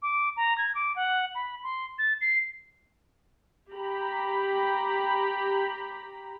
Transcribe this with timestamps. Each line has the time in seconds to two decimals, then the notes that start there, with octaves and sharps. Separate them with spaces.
0.02 D6
0.37 A#5
0.58 G#6
0.75 D6
0.96 F#5
1.35 B5
1.64 C6
1.99 A6
2.21 C7
3.73 G4 A#5 B5